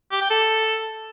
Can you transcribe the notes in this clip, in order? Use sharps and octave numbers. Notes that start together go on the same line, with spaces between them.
G4
G5
A4